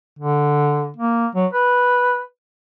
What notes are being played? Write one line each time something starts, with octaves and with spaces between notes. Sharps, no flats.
D3
A#3
F#3
B4